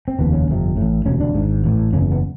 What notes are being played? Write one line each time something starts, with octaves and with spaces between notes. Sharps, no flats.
C4
F1 D#2 C#3 B3
C#4
G1 F2 C3
A1 A2
E1 D2 C3 C#4
D4
G#1 G#2
A1 A2
F#1 E2 C#3 C#4
B3